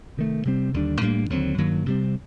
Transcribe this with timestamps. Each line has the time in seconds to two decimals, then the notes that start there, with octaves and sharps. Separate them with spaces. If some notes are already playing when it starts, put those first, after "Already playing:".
0.17 C3 D#3 A3
0.45 C3 G3 C4
0.74 D#2 D3 G3 D4
1.01 A2 G3 A#3 D4
1.30 D#2 D3 F#3 C4
1.58 G2 D#3 F#3 A#3
1.86 C3 G3 C4